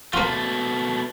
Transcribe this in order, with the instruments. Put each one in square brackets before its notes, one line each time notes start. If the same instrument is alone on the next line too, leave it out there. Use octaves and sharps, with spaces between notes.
[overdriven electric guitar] B2 A3 [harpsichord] A#3 F4